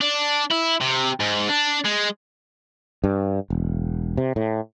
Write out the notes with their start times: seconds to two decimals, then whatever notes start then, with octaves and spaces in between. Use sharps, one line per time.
0.01 D4
0.51 E4
0.81 C3
1.20 G#2
1.50 D4
1.85 G#3
3.04 G2
3.50 E1
4.17 C3
4.36 A2